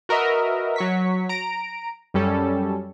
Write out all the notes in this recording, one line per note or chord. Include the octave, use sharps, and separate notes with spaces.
F#4 A#4 B4 D#5 E5
F#3 C#6 B6
A#5 D7
F#2 G3 C#4 A4